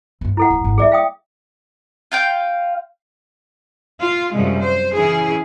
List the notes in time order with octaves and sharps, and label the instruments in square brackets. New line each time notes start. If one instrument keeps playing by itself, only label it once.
[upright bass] D2 G2
[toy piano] E4 A4 F#5
[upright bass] D1
G#1
[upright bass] G3 A#3 [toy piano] G#4 D5 E5
[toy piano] F5 G5 D#6
[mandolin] F4 F5 G5
[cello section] F4
F#2 C3 F3 G3 G#3
C5
C#3 E3 C#4 E4 G#4